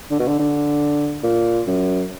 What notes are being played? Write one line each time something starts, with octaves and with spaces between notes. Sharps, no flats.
D3
B2
D3
D3
A#2
F#2